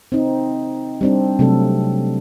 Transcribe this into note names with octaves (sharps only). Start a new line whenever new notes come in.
C4 D#4
G3 C4 D4
C3 F#3 A3 D4 A4